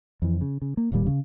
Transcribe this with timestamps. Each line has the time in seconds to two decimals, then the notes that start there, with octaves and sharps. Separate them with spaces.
0.22 F2 E3
0.41 C#3
0.62 C#3
0.77 A#3
0.92 D1 D#2 A#2 G3
1.07 C#3